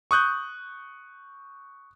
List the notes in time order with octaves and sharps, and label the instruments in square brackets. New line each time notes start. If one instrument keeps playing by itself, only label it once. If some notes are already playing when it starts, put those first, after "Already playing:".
[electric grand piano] C#6 D#6 F#6 G6